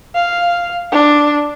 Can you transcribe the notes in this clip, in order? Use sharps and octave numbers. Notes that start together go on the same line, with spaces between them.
F5
D4